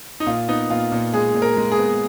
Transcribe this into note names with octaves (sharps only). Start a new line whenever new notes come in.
D#4
A#2 F4
B3 D#4
A#2 F4
A#2
G#3 G#4
A#2
A#4
G#3
G#4
B3